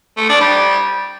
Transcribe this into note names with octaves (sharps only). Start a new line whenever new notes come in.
A3
D4
G3